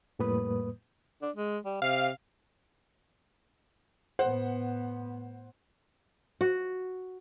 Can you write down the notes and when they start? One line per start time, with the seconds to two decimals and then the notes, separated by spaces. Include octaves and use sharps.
0.19 F2 A2 G3 A#3 B4 D#6
1.22 D4
1.36 G#3
1.65 G3
1.82 C3 F5
4.19 A2 B3 C5 F#5
6.41 F#4